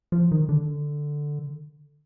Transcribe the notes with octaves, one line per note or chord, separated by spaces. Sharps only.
F3
D#3
D3